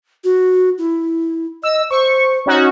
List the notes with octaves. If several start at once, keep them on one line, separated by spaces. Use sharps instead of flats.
F#4
E4
D#5 E6
C5 C#6
C#4 D#4 F#4